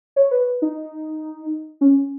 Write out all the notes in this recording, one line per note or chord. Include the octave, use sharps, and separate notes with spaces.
C#5
B4
D#4
C#4